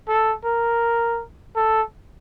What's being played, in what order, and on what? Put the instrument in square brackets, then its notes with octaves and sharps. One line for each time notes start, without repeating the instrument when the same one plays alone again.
[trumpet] A4
A#4
A4